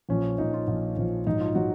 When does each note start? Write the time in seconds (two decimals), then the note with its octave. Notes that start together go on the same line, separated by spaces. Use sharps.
0.09 A#1 A#2 F3 C#4
0.38 A#1 A#2 F3 D#4
0.54 F4
0.68 A#1 A#2 F3
0.97 A#1 A#2 F3
1.26 A#1 G#2 F#3 D#4
1.40 F4
1.55 F#3 F#4